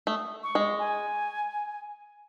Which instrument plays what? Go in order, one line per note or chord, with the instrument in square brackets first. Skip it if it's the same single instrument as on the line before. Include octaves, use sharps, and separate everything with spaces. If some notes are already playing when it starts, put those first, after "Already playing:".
[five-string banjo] A3 [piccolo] D#6
[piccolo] C#6
[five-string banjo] G#3
[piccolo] G#5